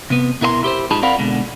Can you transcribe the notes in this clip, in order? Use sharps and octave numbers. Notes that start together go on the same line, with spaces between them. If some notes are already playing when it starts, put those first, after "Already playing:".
C3 B3
B2 E4 A#4 D#5 C6
E4 G4 B4 C5
G#2 D#4 F4 G#4 A5 B5
C4 A#4 D5 F5 F#5 B5
B2 D3 G#3